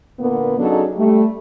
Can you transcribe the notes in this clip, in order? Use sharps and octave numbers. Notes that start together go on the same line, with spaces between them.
A#2 D3 A#3 B3
C#3 F#3 D4 D#4 A4
G3 A3